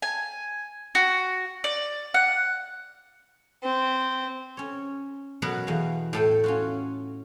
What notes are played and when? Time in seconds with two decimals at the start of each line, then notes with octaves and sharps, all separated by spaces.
0.02 G#5
0.95 F#4
1.64 D5
2.14 F#5
3.63 C4
4.57 C#4 C#5
5.42 B2 F#3 B3 A#4 B4
5.67 E2 F5
6.13 A2 A4 G5
6.44 C#4 F4 F#4